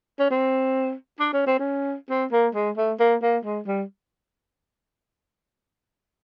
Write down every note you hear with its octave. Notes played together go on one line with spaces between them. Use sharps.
C#4
C4
D4
C#4
C4
C#4
C4
A#3
G#3
A3
A#3
A#3
G#3
G3